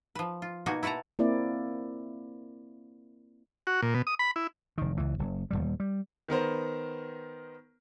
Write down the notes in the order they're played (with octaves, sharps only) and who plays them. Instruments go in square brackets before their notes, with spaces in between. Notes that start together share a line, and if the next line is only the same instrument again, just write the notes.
[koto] F3 B4
F4
B2 A#3 D#4 F#4 G#5
E4 F#4 B4 A5 A#5
[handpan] A#3 C4 E4 D5
[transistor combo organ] F#4
A#2
B2
D#6
B5
E4
[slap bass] F1 D#3
C#2 E3
F#1
D#1 B1 G3
G3
[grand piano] D#3 B3 A#4 C5